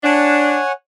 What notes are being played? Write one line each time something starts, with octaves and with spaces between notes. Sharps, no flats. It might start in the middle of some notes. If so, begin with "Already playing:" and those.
D4 C#5 F#5 G#5